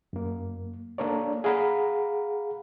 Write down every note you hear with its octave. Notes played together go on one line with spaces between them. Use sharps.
F#2 A#3
A#3 D4 A4 A#4 C#5 D5
G#4 F5 F#5 A#5 B5